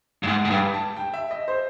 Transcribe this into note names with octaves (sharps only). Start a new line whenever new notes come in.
G2
G#2 F#5
G#2
G2 G5
A5
G5
E5
D#5
C5